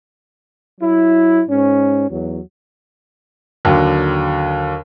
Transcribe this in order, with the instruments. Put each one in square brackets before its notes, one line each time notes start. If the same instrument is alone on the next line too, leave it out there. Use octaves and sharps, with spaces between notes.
[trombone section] F#3 E4
G#2 C#4
E2 F#3
[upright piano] D#2 D3 F#3